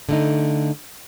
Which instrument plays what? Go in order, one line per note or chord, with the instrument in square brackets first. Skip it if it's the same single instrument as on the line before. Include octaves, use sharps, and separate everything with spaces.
[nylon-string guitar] D3 A3 D#4